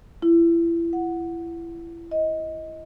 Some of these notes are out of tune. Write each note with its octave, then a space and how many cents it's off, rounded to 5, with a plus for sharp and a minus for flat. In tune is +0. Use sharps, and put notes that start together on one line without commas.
E4 +30
F#5 -5
D#5 +20